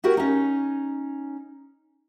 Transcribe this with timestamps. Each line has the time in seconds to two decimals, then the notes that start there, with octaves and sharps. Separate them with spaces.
0.04 B3 E4 F#4 G4 A#4
0.17 C#4 D#4